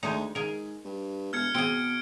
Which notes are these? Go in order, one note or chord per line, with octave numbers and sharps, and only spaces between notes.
D2 G#3 D#4
G#2 G#4 A#4
G2
E1 F6 G#6 C#7
B2 C4 G#4 D7